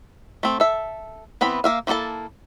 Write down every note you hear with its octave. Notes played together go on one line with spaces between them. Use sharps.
A3 C4
A4 E5
E3 B3 C4 B5
A#3 E5 F5
F3 A#3 E4 A4 A5